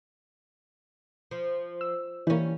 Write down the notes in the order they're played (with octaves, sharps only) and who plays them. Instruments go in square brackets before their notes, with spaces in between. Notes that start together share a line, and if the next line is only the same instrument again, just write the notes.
[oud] F3
[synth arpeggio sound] E6
[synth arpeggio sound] E3 A#3 [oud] G3 C#4